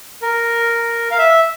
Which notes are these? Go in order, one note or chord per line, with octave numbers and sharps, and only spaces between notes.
A#4
F5
E5